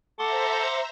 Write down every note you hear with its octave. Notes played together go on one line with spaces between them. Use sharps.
A4 C5 E5 F#5 A#5 C6 D6